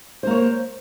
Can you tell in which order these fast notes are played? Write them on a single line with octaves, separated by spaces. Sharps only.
C5 A#3 C#5